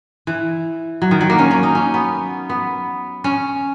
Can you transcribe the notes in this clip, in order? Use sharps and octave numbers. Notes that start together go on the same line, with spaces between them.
E3
F#3
D#3
F#3
A#3
C#4
C#4
D#4
C#4
B3
B3
C#4